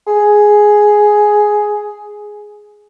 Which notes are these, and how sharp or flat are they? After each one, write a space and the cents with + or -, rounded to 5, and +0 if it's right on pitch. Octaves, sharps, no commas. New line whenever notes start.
G#4 +5